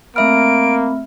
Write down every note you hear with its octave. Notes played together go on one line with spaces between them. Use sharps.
A3 A#3 C4 E5 B5 F6 D7